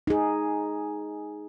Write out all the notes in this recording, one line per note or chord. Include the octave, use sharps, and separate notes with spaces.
D#4 G#4